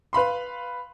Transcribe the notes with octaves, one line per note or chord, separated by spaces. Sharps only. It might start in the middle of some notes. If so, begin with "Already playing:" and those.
B4 F5 B5 C6